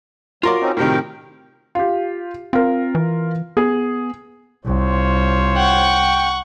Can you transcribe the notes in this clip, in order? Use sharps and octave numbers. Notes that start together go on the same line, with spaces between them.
F#3 F4 F#4 A#4 D5 C6
C4 C#4 D#4
A2 C3 D#3 A#4 G5
F4 G4
C4 F4 A#4
E3
B3 G#4
C2 F4 C5 C#5
F#5 G5 C#6